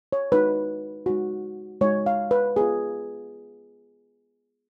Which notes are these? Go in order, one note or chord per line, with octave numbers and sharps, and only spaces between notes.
C#5
G#3 D#4 F#4 B4
G#3 D#4 F#4
G#3 D#4 F#4 C#5
F5
B4
B3 F4 G#4